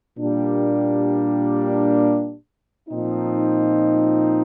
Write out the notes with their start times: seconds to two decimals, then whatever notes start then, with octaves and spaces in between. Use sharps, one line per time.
0.17 A#2 G3 A#3 D4 G4
2.88 A#2 F3 C4 D#4